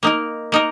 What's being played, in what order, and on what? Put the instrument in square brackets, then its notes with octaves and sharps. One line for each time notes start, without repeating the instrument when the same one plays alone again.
[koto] A#3 D#4 A#4
A#3 D#4 A#4